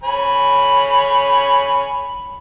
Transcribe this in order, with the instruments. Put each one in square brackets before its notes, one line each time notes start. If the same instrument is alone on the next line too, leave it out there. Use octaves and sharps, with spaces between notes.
[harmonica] C#5 G#5 B5